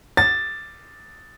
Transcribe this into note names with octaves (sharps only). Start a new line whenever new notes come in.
A6